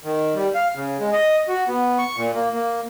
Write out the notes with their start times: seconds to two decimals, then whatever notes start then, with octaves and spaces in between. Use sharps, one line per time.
0.04 D#3
0.35 G3
0.55 F5
0.75 C#3
1.00 G#3
1.13 D#5
1.48 F#4
1.68 B3
1.98 C#6
2.16 A#2
2.35 A#3
2.53 A#3